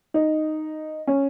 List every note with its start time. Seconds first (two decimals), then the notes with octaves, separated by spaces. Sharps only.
0.14 D#4
1.07 C#4